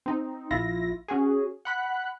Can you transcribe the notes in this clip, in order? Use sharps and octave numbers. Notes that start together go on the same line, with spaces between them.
C4 D#4
A#1 E4 F4 A#6
C#4 F#4 G#4
F#5 B5 F#6